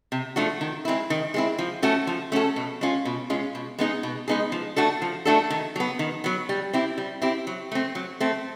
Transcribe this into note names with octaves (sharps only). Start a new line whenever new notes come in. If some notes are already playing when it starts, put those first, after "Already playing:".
C3
F3 A3 D4 F#4
D#3
G#3 C4 E4
D#3
G#3 C4 E4
F3
A3 C#4 F#4 A4
F3
A3 C#4 F#4 A4
B2
G#3 C#4 F4
B2
G#3 C#4 F4
B2
G#3 B3 D#4 G#4
B2
G#3 B3 D#4 G#4
F3
A3 D4 F#4 A4
F3
A3 D4 F#4 A4
D#3
F#3 B3
D#3
F#3 B3
G3
C4 E4 G4
G3
C4 E4 G4
F#3
A3 C4
F#3
A3 C4